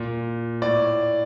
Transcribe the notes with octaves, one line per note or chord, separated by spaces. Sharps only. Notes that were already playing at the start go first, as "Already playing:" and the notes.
Already playing: A#2
A2 D5